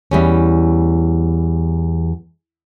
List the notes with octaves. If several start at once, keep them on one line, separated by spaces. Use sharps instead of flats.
E2 G3 C#4